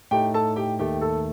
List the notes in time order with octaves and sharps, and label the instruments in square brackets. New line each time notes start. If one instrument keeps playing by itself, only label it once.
[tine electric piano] A2 A3 D#4 [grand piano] G4 G5
[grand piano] A4 A5
G4 G5
[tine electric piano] D#2 D#3 A3 [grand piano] G4 G5
[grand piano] A4 A5